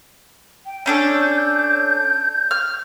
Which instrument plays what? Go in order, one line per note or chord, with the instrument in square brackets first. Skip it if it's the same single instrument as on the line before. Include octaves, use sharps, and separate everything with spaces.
[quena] G5
[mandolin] C#4 D4 A4 [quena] G6
[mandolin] F6